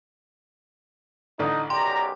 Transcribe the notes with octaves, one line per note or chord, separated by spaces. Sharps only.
A1 D3 D#4 D5
B1 F#2 G4 D5 G5 A#5 C6